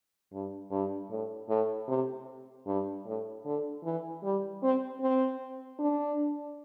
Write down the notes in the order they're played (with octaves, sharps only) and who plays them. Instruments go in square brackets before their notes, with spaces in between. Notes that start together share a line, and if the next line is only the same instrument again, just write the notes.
[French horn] G2
G2
A2
A2
C3
G2
A2
D3
E3
G3
C4
C4
D4